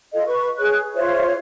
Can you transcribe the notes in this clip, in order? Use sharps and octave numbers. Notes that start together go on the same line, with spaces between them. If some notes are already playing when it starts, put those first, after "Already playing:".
F4 A4 D#5 F5
B4 C#6
G#4 C#5 F#6
F4 C5 C#5 E5